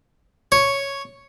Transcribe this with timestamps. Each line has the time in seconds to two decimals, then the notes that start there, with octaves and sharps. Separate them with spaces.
0.52 C#5